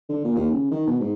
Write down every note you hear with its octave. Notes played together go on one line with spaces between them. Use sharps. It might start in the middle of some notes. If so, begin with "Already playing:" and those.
D3
A#2
D#2
C#3
D#3
B2
G#2